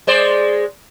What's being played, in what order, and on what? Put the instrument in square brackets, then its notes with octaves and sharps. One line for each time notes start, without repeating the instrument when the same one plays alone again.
[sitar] G#3 C5 D5